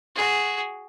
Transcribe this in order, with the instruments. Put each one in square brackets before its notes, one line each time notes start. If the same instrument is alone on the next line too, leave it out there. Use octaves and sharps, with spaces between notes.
[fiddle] F#4 G#4